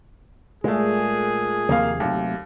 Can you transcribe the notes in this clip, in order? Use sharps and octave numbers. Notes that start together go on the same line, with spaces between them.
A#2 G#3 A3 G#4
D#2 C3 F3 A#3 F5
D#2 C3 F#3 A3